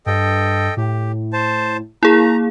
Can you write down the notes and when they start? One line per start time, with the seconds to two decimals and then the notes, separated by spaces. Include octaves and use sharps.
0.06 G2 A4 D#5 G5
0.77 A2 G4
1.33 C5 A5
2.03 A#3 E4 G#4 A#5